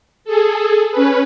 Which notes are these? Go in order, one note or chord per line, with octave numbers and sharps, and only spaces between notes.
G#4 A4
C#4 B4